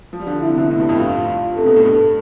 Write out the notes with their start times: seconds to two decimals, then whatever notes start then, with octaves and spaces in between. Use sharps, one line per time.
0.13 F3
0.20 G3
0.26 D3 F3
0.41 D3 E4
0.49 C3
0.57 B2 D3
0.70 A2 C3 E4
0.80 G2 B2
0.89 F2 A2
0.99 G2 F4
1.56 C3 A4
1.66 B2
1.76 A2
1.85 G2 A4